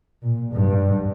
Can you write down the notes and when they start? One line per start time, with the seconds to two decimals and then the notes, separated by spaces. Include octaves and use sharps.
0.23 A#2
0.53 G2